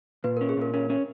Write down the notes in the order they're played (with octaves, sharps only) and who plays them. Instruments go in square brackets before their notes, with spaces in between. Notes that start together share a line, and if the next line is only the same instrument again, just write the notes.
[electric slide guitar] A#2 [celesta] B4
[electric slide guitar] C#4 [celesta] A#4
[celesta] G#4
[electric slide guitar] A#2 [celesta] A#4
[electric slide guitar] C#4 [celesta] A#4
[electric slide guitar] C#4